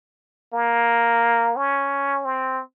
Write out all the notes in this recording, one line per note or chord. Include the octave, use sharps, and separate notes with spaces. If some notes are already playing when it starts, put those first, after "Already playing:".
A#3
C#4
C4